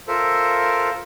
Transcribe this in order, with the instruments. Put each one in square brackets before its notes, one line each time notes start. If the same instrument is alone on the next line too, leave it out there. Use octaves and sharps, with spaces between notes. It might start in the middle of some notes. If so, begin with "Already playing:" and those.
[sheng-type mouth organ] F4 A4 A#4 C5 E5